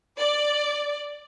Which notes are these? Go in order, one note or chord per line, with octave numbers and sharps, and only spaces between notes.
D5